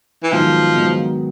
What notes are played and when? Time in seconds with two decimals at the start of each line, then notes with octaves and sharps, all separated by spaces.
0.23 E3
0.32 G#2 D#3 F3 F#3 B3 D#4
0.75 G#2 D#3 F#3 B3 D#4